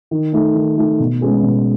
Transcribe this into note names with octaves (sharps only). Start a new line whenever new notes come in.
D#3
A3 D#4
D#3
A3 D#4
B2
G#3 C#4 G#4 B4
B2